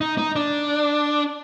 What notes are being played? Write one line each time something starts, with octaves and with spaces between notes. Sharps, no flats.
D#4
D#4
D4